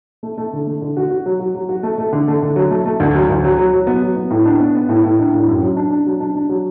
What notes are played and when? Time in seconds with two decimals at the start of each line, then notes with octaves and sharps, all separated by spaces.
0.23 A3
0.38 A3
0.53 D3
0.67 A3
0.82 D3
0.96 F#4
1.11 F#4
1.26 F#3
1.39 F#4
1.55 F#3
1.69 F#4
1.83 A3
1.98 A3
2.13 D3
2.28 A3
2.42 D3
2.56 F#3
2.70 A3
2.86 A3
3.00 D2
3.15 F#3
3.29 D2
3.44 F#3
3.58 F#3
3.73 F#3
3.87 B3
4.02 F#3
4.16 B3
4.30 A2
4.45 D4
4.60 B3
4.75 B3
4.89 A2
5.04 A2
5.19 D4
5.34 A2
5.48 F#2
5.62 F#3
5.76 D4
5.91 D4
6.06 F#3
6.20 D4
6.35 D4
6.49 F#3